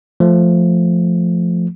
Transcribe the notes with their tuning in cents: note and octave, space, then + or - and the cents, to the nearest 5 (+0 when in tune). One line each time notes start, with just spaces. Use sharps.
F3 +0 A3 +5